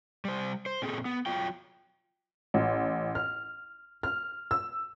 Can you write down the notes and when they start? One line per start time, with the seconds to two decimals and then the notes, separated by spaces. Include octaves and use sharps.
0.25 G3 C5
0.66 C5
0.82 A#2 A3 C4 D#4 G#4 A4
1.05 B3
1.26 F#3 F4 G5
2.54 A1
3.15 F6
4.03 F6
4.51 E6